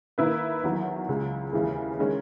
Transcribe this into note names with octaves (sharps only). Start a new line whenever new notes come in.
D#3 A#3 E4 B4
E2 D#3 F#3
C#2 C#3 G#3
D#2 C#3 E3 G#3
D#3 G#3 C#4